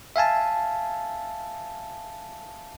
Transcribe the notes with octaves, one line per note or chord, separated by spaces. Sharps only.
E5 F5 G#5 A5